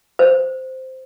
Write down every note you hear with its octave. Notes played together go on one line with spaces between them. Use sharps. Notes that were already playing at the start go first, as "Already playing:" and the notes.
C5